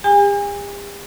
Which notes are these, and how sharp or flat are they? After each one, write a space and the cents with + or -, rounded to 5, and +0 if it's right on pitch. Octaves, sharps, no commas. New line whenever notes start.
G4 +45 G#5 -35